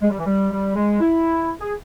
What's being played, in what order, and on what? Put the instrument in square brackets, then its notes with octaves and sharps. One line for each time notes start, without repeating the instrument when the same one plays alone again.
[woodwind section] G#3
G3
E3
G3
G3
G#3
E4
G#4